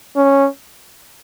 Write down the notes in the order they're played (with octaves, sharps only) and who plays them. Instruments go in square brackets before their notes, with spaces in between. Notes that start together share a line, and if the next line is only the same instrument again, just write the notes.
[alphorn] C#4